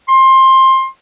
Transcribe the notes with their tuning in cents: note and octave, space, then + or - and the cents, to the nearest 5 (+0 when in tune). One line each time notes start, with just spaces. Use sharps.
C6 +20